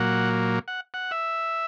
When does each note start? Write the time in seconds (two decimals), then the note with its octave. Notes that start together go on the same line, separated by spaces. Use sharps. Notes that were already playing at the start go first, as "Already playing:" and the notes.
Already playing: A#2 F#3 A#3 F#5
0.68 F#5
0.94 F#5
1.11 E5